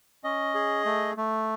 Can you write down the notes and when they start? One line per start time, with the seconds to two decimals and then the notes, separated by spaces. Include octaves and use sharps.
0.24 C#4 D#5
0.55 G#4
0.85 A3
1.17 A3